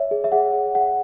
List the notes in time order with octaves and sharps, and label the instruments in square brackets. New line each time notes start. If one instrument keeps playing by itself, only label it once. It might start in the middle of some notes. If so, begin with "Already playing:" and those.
Already playing: [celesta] C#5 E5
G#4
E5
G#4 F#5
G#4
G#4 F#5